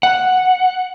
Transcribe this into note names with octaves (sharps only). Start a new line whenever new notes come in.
F#5